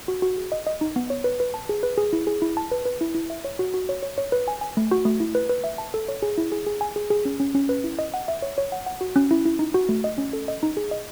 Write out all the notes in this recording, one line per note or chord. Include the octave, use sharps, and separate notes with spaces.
F#4
F#4
G#4
D#5
D#5
D#4
B3
C#5
B4
B4
A5
G#4
B4
G#4
E4
G#4
E4
A5
B4
B4
E4
E4
E5
C#5
F#4
F#4
C#5
C#5
C#5
B4
G#5
G#5
A3
F#4
A3
E4
B4
B4
E5
A5
A4
C#5
G#4
E4
G#4
G#4
G#5
G#4
G#4
C#4
C#4
C#4
B4
E4
D#5
F#5
E5
C#5
C#5
F#5
F#5
F#4
C#4
E4
E4
D#4
F#4
A3
D#5
C#4
A4
D#5
D#4
G#4
D#5